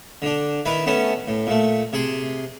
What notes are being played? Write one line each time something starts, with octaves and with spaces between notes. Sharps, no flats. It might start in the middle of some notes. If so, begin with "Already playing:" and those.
D3 D4
D#3 E4 B4
A3 B3 C#4 A5
A2
A#2 A3
C3 G#4 C6